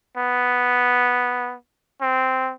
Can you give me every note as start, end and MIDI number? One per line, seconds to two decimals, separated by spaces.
0.17 1.55 59
2.01 2.52 60